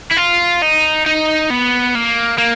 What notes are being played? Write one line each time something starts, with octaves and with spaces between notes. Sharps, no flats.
E4
F4
D#4
D#4
B3
A#3
A#3